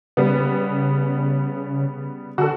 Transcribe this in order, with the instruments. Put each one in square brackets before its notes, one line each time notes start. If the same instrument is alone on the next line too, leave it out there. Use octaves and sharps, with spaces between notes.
[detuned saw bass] C#3 [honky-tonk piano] G3 B3
[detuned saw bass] D3 [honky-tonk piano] F#4 A4